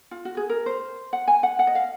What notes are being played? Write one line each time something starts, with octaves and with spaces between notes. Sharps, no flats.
F4
F#4
G#4
A#4
C5
F#5
G#5
F#5
F#5
D#5
F5